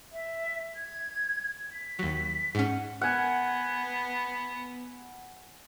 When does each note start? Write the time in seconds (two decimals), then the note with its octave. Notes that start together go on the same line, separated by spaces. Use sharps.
0.12 E5
0.76 G#6
1.72 B6
1.99 D#2 F#3
2.55 G#2 C#4 F#5
3.01 B3 F#5 G#5